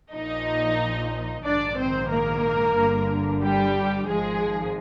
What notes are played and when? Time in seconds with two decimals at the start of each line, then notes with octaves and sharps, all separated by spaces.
0.13 A#1 A#2 F3 D#4 D#5
1.44 A#1 G#2 D#3 D4 D5
1.78 C4 C5
2.10 A#3 A#4
2.76 G1 G2 D3
3.41 G3 G4
4.07 G#1 G#2 F3 G#3 G#4